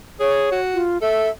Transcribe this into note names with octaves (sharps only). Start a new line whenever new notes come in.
G#4 C#5
F#4
F4
A4 E5